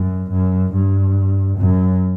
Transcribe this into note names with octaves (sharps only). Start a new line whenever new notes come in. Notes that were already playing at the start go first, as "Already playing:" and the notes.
Already playing: F#2
F#2
G2
F#2